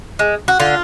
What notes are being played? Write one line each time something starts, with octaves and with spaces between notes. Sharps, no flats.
G#3
F#4
D3 F4